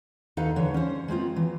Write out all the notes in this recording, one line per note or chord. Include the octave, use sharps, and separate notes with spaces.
D#2 D#4 A4 B4 F5
D3 E3 C#5
C#4 C5
G#3 A#3 C4 F4
E3